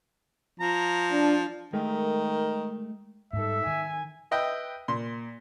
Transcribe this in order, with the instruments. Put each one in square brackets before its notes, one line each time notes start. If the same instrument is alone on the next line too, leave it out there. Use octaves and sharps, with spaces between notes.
[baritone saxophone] F3 [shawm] A#5
[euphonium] D4
[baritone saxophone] D#3 [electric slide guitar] G#3 A3 A#4
[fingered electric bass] G#2 G3 [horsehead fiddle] D#4 A4 [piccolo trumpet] E5
[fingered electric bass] D#3 [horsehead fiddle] G#5
[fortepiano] B4 D#5 E5 G5
A#2 C6